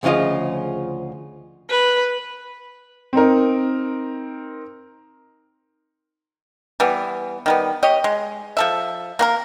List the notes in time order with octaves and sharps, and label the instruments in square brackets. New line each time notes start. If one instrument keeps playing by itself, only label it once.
[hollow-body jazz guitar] D2 C#3 F3 F4 D#5
[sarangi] B4
[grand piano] C4 D#4 A#4
[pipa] E3 G3 B3
D#3 G3 B3
G4 C#5 D#5
G#3
F3 A4 E5
A#3 F#4 A#4